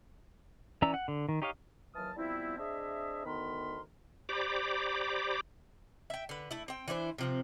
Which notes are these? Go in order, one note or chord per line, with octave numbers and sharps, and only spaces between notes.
E3 C#4 D5 A#5 E6
F#5
D3
D#3
D#4 G4 C#5 D#5 F5
D#2 E3 F#3 A5 D#6 F6
F3 G3 B3 C4 E4
C4 D4 G#4 D#5 E5
D2 D#3 B3 A#4 B5 C6
G4 C5 D5 A#5 B5 D6
E5 G5
D3 B4
A3 E4
C4 G5
E3 D4 E4 C5
C3 F3 C4